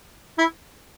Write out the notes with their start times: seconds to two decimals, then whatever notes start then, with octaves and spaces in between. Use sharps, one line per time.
0.38 E4